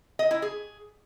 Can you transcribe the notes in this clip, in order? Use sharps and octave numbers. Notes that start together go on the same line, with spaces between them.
D#5
E4
G#4